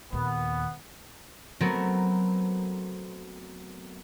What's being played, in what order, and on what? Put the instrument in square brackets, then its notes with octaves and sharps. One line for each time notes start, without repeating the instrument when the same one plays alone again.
[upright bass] D#2 A#2 [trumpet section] B3
[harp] F#3 A3 B3 C4 A#4